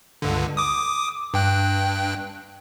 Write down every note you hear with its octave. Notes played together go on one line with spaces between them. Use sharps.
C#2 G2 D3
D6 D#6
G2 G5 F#6